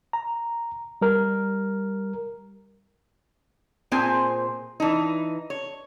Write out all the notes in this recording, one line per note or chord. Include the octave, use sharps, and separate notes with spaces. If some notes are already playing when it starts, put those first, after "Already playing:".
A#5
G3 A#4
A#2 C4 G#4 C5 G#5
E3 D#4
C#5